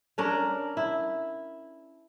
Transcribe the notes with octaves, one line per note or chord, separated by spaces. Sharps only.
C#4 D4 A#4
E4